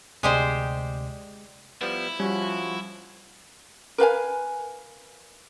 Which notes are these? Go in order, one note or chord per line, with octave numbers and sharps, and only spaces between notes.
D2 C3 G#3 G4 C5 D5
F3 G3 B3 E4
F3 G3 C#4 F#4
A#4 B4 F5 G#5